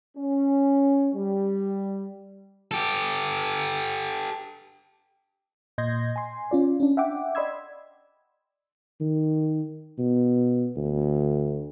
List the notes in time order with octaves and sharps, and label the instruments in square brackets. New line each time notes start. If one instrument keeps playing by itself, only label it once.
[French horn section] C#4
G3
[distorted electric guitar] G4 A4
[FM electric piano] A#2 D#5 C6 G6 G#6 A#6
G#5 C6
C#4 F4 D5
C#4 D4
E5 F#5 G5 D6
D5 D#5 B5 C6 E6 G#6
[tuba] D#3
B2
D2